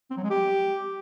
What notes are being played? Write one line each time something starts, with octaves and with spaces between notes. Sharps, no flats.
C4
F#3
G#3
G4